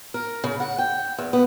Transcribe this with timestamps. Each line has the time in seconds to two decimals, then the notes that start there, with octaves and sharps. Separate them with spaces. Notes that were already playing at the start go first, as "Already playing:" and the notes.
0.14 A#4
0.44 C#3
0.60 F#5
0.78 G5
1.18 E2
1.33 B3